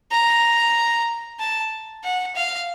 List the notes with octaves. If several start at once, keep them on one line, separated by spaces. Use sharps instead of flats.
A#5
A5
F#5
F5